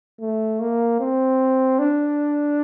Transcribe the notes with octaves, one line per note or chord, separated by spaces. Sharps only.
A3
A#3
C4
D4